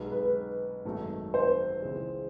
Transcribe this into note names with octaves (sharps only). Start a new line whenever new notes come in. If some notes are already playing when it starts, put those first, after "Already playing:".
Already playing: B1 B2 G#3 B3 D#4
B4
G#1 F#2 D#3 F#3 A3
C5
C#2 C#3 E3 G#3 C4